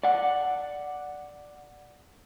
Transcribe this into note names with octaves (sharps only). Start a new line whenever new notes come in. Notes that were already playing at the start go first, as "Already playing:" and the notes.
D5 F#5